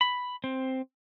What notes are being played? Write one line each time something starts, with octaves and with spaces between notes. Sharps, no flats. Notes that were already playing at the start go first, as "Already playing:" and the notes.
B5
C4